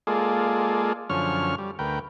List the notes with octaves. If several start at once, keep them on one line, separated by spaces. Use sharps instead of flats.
G#3 A#3 F4 G#4 A4 D5
F#2 D3 F3 C#4 C#6 F6
G3
D2 A#4 B4 G5